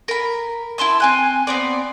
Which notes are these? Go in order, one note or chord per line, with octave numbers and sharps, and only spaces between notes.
A#4 B5
E4 A5 C6 E6
C4 G#5 F#6
B3 C4 D5